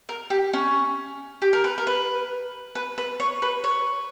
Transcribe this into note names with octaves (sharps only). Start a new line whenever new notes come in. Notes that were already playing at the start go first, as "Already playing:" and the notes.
A#4
G4
C#4
G4
A#4
B4
A#4
B4
B4
B4
C#5
B4
C#5